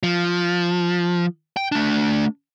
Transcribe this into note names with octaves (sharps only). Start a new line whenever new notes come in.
F3
G5
A3 D4